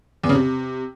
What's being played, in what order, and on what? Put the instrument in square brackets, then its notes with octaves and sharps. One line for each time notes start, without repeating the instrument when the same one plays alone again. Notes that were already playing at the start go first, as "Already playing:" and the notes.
[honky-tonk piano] E2
C#3
C3